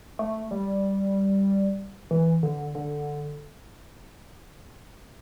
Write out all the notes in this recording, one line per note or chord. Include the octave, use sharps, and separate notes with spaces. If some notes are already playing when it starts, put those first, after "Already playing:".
A3
G3
E3
D3
D3